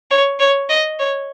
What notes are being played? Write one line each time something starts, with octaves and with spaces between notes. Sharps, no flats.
C#5
C#5
D#5
C#5